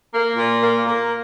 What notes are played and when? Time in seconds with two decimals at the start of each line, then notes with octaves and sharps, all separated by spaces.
0.14 A#3
0.36 A#2
0.61 A#3
0.86 A#3